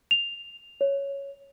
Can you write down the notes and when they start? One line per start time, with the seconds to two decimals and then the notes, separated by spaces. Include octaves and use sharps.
0.11 F7
0.81 C#5